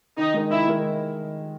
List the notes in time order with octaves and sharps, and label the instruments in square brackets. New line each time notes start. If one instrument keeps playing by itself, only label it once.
[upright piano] D#3 [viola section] D#4
[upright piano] G#3 D#4 A#4
[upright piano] D#3 [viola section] E4
[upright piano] G#3 D#4 A#4